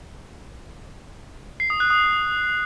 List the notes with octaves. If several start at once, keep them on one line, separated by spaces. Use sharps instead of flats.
C7
D#6
F#6
D#6